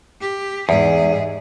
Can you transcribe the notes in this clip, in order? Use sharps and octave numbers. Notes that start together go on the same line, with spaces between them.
G4
E2 G#2 G#4